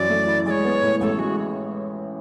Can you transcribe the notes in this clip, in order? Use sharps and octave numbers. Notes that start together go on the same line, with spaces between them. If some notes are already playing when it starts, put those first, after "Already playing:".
Already playing: F#2 E3 E4 D5
A3
E4
G#3 C#5 D5
B3
A2
A1 A4
G#3 F#4